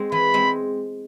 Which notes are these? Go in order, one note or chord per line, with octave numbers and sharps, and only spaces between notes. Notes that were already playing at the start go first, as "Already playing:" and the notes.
Already playing: G#3 C4
E3 B5
G#3 C4